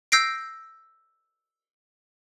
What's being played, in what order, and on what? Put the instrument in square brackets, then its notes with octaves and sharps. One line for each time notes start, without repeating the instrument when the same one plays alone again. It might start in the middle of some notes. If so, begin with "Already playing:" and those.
[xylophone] E6 G6 A#6 C7 D7